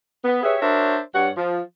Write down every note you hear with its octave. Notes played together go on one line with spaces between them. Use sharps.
B3
G4 G#4 B4 C#5 E5
D4 F#4 A#4 C5 C#5 E5
G2 C#5 F#5
F3